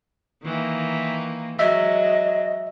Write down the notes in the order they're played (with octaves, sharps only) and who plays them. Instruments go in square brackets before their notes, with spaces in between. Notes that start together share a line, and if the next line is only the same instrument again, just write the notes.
[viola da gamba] D#3 E3 A#3
[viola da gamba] F#3 G#3 [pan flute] D#5 [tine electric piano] E5